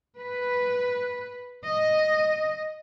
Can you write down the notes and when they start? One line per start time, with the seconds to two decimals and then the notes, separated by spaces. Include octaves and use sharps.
0.18 B4
1.65 D#5